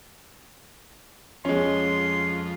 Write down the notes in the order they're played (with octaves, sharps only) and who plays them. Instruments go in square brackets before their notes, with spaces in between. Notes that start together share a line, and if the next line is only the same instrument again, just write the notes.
[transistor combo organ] F2 [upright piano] G#3 C#4 [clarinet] C6